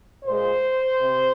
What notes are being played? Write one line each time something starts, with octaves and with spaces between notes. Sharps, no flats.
A#2 G#3 C5
C3